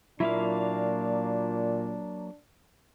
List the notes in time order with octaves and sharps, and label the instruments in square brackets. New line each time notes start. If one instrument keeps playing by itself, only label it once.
[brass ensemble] A#2 [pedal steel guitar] F#3 A#3 F5 [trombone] D4 [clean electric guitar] E4 F4 E5